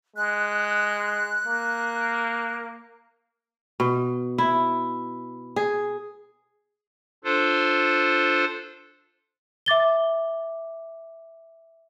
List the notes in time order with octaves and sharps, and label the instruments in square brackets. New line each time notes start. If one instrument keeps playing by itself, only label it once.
[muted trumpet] G#3 [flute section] F#6
[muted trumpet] A#3
[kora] B2
E4
G#4
[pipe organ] D4 F4 A4 C5
[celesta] E5 D6 A6 G7